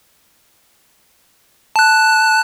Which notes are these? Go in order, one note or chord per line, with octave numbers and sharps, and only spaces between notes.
A5 F#6